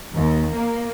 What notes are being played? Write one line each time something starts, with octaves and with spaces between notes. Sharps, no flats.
D#2
A#3